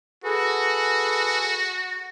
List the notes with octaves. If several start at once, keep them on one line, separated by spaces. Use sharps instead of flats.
F#4 G#4 A4 B4